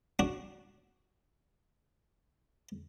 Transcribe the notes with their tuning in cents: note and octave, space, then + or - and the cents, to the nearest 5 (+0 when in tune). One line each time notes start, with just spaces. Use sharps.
D4 +0 F#4 +0